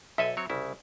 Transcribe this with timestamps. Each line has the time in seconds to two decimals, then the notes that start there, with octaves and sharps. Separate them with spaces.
0.18 B1 A4 E5 G#5
0.37 F#3 C4 C#5
0.50 C2 C#3 E4